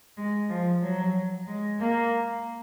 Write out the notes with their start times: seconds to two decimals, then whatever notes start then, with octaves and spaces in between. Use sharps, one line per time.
0.17 G#3
0.49 F3
0.82 F#3
1.47 G#3
1.80 A#3